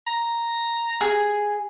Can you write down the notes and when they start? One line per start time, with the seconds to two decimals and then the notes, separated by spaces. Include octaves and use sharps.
0.07 A#5
1.01 G#4